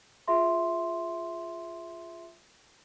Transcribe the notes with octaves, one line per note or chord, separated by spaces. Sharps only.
F4 G#4 E5 C6